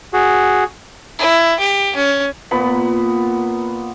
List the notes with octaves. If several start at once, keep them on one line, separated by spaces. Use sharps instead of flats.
F#4 G#4
E4
G4
C#4
A#2 B3 B5